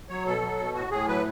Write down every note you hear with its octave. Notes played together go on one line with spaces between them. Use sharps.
F#3 C#5
B2 A4
F#3
B2
A2 F#4
A2 G#4
F#3 B4